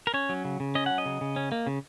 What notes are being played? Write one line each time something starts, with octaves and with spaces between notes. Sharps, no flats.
A#4
C#4 C#5
F#3
C#3
C#3
C#4 D#5
F#3 F#5
D#5
C#3
C#3
C#4
A#3
C#3